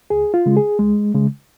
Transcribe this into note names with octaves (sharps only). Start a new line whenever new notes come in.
C#2 G#4
F4
C#3 G#3
G#4
C#2 G#3
C#3 G#3